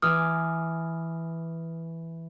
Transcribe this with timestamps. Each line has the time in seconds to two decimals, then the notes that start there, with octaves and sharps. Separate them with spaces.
0.02 E3 G#5 D6 D#6 F6